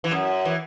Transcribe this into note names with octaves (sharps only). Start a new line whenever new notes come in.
E3
F#2
E3